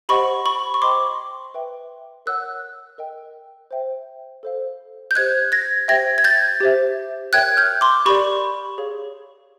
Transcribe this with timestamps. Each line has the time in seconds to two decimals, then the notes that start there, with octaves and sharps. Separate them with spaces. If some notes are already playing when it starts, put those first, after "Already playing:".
0.09 G4 C5 D#5 F#5 B5 C#6
0.46 B5 C#6
0.74 C#6
0.82 C5 D#5 G5 C6 D6
1.54 B4 E5 G5
2.26 A#4 C#5 F#5 E6 F#6
2.98 A#4 D#5 G5
3.71 C5 E5 G5
4.43 A4 C5 F5
5.11 G6
5.15 G4 C5 D#5 F#6 G#6
5.52 G#6 A#6
5.88 G4 C5 E5 G5 G#6 A#6
6.18 G#6
6.24 G6 A6
6.60 G4 C5 E5
7.33 A#4 C#5 E5 G5 F#6 G#6
7.57 F6 G6
7.81 C6 D6
8.06 G4 A#4 D5 B5 C#6
8.78 G#4 C#5 F5